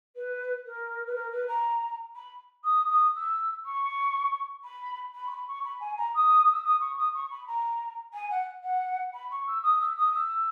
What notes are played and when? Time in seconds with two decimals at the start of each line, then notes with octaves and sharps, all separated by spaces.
0.15 B4
0.65 A#4
1.06 B4
1.15 A#4
1.32 B4
1.47 A#5
2.15 B5
2.64 D#6
2.89 D#6
3.14 E6
3.65 C#6
4.63 B5
5.14 B5
5.27 C#6
5.30 B5
5.47 C#6
5.64 B5
5.80 G#5
5.97 A#5
6.14 D#6
6.51 E6
6.64 D#6
6.80 C#6
6.97 D#6
7.14 C#6
7.30 B5
7.46 A#5
8.13 G#5
8.30 F#5
8.63 F#5
9.13 B5
9.30 C#6
9.46 E6
9.63 D#6
9.80 E6
9.97 D#6
10.13 E6